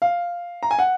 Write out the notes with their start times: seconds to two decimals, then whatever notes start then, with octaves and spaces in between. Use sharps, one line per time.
0.02 F5
0.63 A#5
0.71 G#5
0.79 F#5